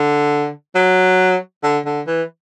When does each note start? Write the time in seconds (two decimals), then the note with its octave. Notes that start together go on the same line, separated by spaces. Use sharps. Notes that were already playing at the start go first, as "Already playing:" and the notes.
Already playing: D3
0.75 F#3
1.63 D3
1.86 D3
2.07 E3